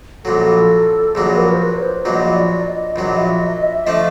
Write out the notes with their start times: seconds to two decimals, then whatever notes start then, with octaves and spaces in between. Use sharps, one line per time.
0.25 A#1 A#2 F#3 A4
1.15 A#1 A#2 F#3 G#4
1.34 B4
1.38 A#4
1.53 C5
1.60 B4
1.78 C#5
1.83 C5
2.05 A#1 A#2 F#3 D#5
2.35 D5
2.66 D#5
2.95 A#1 A#2 F#3 D#5
3.18 E5
3.41 D#5
3.63 E5
3.86 F3 A3 D4 D#5